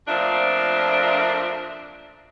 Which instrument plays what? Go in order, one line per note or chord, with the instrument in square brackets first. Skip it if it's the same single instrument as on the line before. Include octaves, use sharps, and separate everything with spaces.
[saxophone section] F2 A#2 F3 A3 D4